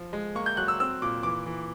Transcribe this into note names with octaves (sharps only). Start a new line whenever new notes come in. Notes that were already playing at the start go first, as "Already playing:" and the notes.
Already playing: F3
G#3
A#3 C#6
G6
F#3 F#6
E6
C4 E6
A#2 D6
E3 D6
E3